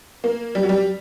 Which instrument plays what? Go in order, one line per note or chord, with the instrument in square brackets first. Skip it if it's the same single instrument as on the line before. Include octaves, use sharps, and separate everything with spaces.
[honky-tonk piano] A#3
G3
F#3
G3